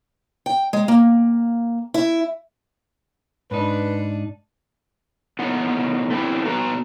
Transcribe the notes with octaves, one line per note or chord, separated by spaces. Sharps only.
G5
G#3
A#3
E4
G#2 D4 D#4 B4
A2 B3 D#4 F#5
A3 B3 C4 D4 E4
B3 F#4 B4 A#5